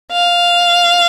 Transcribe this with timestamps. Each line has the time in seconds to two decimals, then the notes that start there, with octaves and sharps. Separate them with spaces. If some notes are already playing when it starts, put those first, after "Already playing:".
0.12 F5